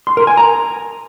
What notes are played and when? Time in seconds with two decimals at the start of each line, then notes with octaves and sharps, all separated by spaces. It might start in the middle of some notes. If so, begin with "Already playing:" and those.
0.07 C6
0.17 A#4
0.27 G#5
0.37 A#5